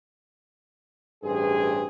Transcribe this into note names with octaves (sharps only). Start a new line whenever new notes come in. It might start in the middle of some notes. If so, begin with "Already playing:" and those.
A1 G2 C4 G#4